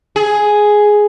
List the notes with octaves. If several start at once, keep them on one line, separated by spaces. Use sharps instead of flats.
G#4